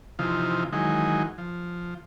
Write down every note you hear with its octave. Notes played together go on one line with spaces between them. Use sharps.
C3 E3 F3 D#4 F4
D#3 E3 F#3 G#3 D#4
F3